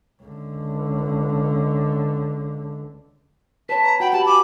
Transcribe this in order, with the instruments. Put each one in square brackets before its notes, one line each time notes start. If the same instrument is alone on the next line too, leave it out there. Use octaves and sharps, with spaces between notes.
[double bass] C#2 D3
[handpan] B4 C#5 [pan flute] A5 [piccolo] B6
[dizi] A#5
[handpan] F#4 [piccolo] F#5 [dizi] G5 [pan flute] B5
[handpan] F#4 G4 [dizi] A5
[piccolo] G#5 [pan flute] B5 [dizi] D6